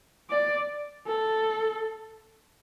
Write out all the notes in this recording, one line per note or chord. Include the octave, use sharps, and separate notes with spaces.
D5
A4